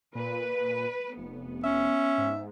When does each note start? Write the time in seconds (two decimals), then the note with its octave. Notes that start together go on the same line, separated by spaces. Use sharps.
0.15 A#2 B4
1.17 F1 B3
1.64 C#4 E5
2.18 G#2